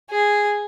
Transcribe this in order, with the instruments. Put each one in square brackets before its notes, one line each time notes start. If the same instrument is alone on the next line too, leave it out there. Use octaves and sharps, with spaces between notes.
[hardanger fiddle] G#4